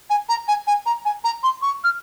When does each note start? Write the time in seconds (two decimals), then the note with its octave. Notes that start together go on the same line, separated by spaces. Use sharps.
0.10 G#5
0.29 A#5
0.48 G#5
0.67 G#5
0.86 A#5
1.05 G#5
1.24 A#5
1.43 C6
1.62 C#6
1.84 F6